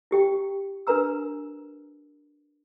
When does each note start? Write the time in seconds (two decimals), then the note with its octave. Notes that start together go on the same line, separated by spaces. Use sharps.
0.11 E4 G4 G5
0.87 D4 A#4 B4 A#5 E6